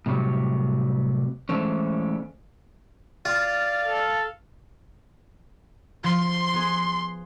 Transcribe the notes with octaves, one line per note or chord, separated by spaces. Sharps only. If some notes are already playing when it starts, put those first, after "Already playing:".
A2 C3 F#3 G3
E3 G#3 A3 C4 C#4
F4 D5 F5
A4
F3 C6
B3 G#4